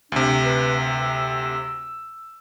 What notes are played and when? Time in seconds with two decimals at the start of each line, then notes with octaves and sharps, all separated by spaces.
0.12 D2 C3 D4
0.45 B4
0.82 E6